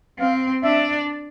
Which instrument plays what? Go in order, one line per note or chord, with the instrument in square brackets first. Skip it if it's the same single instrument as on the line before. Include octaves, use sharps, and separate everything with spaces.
[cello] C4 [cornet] F5
[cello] D4 [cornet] E5